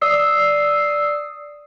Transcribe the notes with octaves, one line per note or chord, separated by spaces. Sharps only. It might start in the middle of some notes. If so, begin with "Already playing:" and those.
D5 D#6 E6 C7